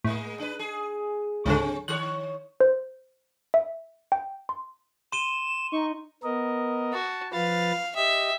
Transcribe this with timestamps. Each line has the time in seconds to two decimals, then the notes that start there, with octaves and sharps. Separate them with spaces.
0.04 A2 G#3 A#3
0.40 D4 B4
0.59 G#4
1.46 C#2 G#2 D3 F#3 C4 C#4
1.88 D#3 G#4 C#5 F#6
2.60 C5
3.54 E5
4.12 G5
4.49 C6
5.12 C6 D#7 E7 G7
5.72 D#4 C#6
6.23 B3 A#4 D#5
6.93 F#4 A5
7.33 F3 B4 F5 A6
7.95 G4 D#5 E5